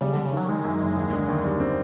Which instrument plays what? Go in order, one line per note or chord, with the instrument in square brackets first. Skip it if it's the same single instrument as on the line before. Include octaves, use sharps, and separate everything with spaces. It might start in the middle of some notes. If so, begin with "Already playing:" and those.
[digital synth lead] C#3 [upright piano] G3
[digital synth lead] D3
[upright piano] G3
[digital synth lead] C#3
[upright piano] D#3 [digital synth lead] F#3
[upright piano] D#3 [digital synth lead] G#3
[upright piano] F#2
F#1
D#2
D3
D#2
G3
C4